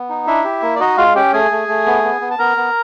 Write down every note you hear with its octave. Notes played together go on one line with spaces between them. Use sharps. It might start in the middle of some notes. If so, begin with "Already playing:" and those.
Already playing: B3
D#4
D4 E4 E5
G4
A#3
D5
D#4 F#4 D#5
G#3 F4 F5
C#4 G4 G5
A3 G#4 G#5
A3
A3
B3
B3
B3
A5
B3 A#4 A#5
B3